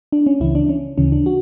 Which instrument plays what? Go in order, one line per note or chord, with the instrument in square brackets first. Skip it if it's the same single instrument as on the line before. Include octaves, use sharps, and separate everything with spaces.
[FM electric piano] D4
C#4
C#2 C#3 E3 E4
D4
C#4
D2 C#3 E3 C#4
D4
F#4